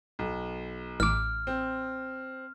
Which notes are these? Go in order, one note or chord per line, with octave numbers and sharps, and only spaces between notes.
B1
A1 D6 F6
C4